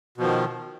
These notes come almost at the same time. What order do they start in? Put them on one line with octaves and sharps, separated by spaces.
B2 F3 D#3